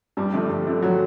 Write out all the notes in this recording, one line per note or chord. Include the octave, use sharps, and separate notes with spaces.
G2 G3
D3 F3 A3
G2
D3 F3 A3
F#3